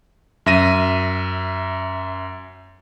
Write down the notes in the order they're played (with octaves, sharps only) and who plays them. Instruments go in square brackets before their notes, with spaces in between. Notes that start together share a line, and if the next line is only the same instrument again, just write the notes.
[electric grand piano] F#2 E5 A#6 D#7